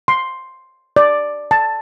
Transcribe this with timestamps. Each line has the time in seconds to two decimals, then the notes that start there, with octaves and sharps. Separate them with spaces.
0.08 C6
0.96 D5
1.51 A5